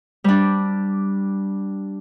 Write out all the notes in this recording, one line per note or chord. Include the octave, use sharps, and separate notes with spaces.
G3 D4